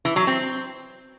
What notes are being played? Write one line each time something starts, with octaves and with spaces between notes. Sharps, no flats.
E3
F#3
C4